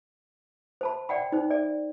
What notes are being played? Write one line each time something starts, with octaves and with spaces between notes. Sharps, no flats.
C5 A5 B5
D5 F#5 G5 B5
D#4 C5
D5